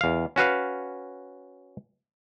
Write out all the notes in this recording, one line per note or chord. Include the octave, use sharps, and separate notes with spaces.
E2 F5
C#4 F#4 B4 F5